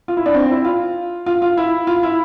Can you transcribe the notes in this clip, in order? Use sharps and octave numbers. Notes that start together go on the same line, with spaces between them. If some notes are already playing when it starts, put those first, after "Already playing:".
F4
E4
D4
C4
E4
F4
F4
F4
E4
F4
E4